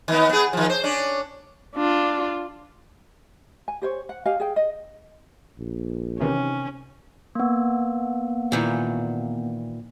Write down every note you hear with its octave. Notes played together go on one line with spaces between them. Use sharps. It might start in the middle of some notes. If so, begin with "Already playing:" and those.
D#3 B3
B3 G#4
D#3 F3
C5
C#4 D4
D4 F4
G#5
G4 C5 C#5
F#5
G4 D#5 F5 G#5
G#4 G5
D#5
A#1
C3 D#3 E3 C#4
A#3 B3
A#2 D#3 E3